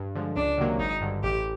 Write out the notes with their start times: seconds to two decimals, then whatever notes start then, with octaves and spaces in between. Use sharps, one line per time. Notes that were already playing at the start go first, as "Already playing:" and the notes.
Already playing: G2
0.15 D3 F3 G#3
0.36 C#2 D4
0.58 C3 D#3 F#3 A#3
0.79 G#1 D#4
1.01 G2 D3
1.23 A1 G4